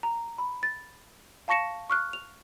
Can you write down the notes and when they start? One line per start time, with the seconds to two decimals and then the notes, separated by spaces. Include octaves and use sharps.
0.03 A#5
0.38 B5
0.63 A6
1.48 F5 A5 C#6 A#6 C#7 E7
1.90 C#6 F6 F#6
2.13 F7